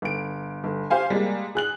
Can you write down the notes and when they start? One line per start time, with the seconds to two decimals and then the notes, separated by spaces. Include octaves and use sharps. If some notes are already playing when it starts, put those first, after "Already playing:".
0.02 G1 D7
0.64 G1
0.90 G4 C5 F5 G#5
1.10 G3 G#3 A#3
1.55 G#4 F#6 F#7